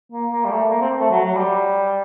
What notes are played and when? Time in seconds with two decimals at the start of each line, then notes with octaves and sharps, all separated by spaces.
0.12 A#3
0.31 A#3
0.44 G3
0.51 A3
0.70 A#3
0.81 C4
1.00 A3
1.11 F#3
1.24 F#3
1.37 G3